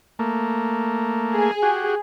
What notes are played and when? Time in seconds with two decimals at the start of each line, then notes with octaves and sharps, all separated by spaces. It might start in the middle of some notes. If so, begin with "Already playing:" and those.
0.19 A3 A#3
1.34 G#4
1.62 F#4 G4